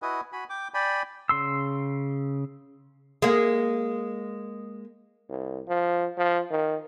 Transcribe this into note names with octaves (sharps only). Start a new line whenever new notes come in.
E4 F#4 B4 D#5 G#5
F#4 G#5 B5
G5 D6
D5 G5 G#5 B5
C#3 C6 E6
G#3 A#3
C2
F3
F3
D#3